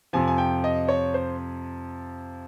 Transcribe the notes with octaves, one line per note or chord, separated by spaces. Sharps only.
F2 C3 F3 G#5
G#5
G5
D#5
C#5
C5